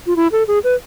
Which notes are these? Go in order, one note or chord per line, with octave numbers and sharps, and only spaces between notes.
F4
E4
A4
G#4
B4